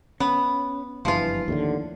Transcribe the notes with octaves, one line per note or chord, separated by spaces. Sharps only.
B3 C#4
F#1 G2 E3 F3 F4
D#2 A2 D3